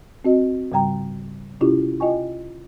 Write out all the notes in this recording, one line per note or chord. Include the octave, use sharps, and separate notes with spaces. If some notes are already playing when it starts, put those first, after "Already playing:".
C4 F#4 D#5
G#2 C#3 G3 G5 A#5
C3 C#4 E4 F4 G4
F4 D#5 G5 G#5 C#6